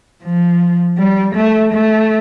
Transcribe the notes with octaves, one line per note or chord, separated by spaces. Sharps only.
F3
G3
A3
A3